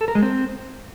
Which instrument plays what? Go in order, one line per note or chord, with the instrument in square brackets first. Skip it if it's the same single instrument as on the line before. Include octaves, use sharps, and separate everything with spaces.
[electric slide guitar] A4
A#4
G#3
C4